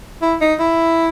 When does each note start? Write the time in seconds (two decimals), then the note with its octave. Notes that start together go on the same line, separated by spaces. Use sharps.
0.22 E4
0.41 D#4
0.59 E4